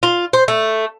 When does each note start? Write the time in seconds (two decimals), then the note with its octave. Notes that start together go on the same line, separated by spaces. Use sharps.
0.03 F4
0.33 C5
0.48 A3